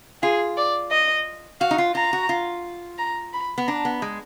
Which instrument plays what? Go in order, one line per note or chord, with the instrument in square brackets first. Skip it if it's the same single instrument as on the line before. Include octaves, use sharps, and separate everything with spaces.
[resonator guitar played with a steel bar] F4 [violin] G#4
[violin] D5
D#5
[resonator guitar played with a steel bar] F#4 [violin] F5
[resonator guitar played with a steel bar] D#4
F4
[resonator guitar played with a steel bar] F4 [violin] A#5
[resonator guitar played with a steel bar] F#4
F4
[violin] A#5
B5
[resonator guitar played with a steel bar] B3
[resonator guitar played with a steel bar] D4 [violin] A#5
[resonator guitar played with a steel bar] B3
G#3